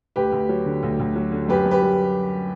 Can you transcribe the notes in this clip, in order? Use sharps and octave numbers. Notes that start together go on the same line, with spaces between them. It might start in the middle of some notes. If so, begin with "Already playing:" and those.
D2 G4 B4
D2
F#3
D3
D2
D2
F#3
D3
F#2 G4 B4
F#2
G4 B4
G3